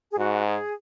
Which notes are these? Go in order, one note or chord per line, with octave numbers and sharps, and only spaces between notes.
G#4
G#2 F#4
G#4